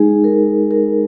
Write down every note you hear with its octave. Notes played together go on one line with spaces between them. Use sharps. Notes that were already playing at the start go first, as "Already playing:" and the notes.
Already playing: G#3 D#4 G#4
A#4
A#4